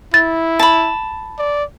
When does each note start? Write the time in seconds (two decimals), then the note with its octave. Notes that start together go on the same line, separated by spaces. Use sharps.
0.14 E4 A6
0.59 A5 B5
1.38 D5